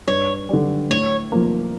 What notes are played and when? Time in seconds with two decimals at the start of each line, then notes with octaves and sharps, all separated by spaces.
0.07 G2 C#5
0.49 D3 G3
0.90 A2 C#5
1.32 F3 A#3